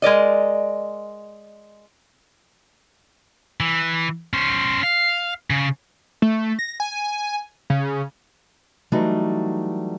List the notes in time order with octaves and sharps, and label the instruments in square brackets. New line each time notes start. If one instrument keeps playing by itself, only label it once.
[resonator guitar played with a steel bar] G#3 A#4 D5 D#5
[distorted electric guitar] E3
C#4 C5
F5
C#3
[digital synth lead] A3
A#6
G#5
C#3
[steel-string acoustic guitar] E3 F#3 G3 A3 D#4